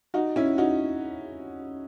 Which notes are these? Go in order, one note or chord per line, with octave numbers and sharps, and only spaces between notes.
D#4 F#4
C#4 E4
D#4 F#4